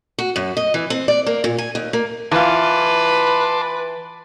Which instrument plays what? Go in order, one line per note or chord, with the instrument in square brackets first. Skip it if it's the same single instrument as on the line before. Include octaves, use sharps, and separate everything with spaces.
[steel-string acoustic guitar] F#4
F#2
D#5
E3
C4
D5
A#3
A#2
G#5
D#2
A#3
[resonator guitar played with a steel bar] E3 F4 [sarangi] B4 [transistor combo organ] A5 C6 D6